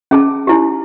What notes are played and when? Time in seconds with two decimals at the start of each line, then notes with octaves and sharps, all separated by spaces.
0.11 C#4 G#4 A5
0.47 D#4 E4 G4